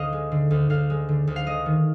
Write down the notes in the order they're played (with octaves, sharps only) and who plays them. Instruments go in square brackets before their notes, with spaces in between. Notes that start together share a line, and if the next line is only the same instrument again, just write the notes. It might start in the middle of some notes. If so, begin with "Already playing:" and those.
Already playing: [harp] D2 D#5 F5
G#3
D3
D2
D2 F5
G#3
D3
D2
F5
G#3 D#5
D#3